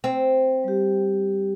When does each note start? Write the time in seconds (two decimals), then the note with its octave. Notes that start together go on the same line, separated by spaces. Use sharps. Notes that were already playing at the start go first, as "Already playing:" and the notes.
0.04 C4
0.64 G3 G4